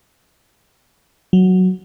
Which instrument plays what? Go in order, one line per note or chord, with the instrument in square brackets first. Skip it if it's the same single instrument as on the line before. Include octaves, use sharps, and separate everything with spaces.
[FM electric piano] F#3